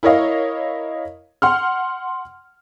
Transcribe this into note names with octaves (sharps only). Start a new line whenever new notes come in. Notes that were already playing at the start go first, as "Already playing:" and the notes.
E4 A#4 C#5 D#5 F5
F#5 C6 F6